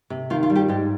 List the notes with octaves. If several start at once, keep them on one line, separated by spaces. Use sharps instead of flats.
C3
D#3 F4
F4
G3
G4
G#2 G4